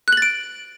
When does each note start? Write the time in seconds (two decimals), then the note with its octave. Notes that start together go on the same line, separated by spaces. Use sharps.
0.08 F#6
0.13 F#7
0.17 A6
0.22 D7